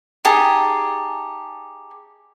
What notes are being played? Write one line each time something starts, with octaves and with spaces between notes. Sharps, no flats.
D#4 G4 G#4 A5